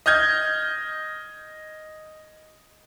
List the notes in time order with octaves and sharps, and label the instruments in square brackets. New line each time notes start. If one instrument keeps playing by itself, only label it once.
[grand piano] D#5 F6 G6 G#6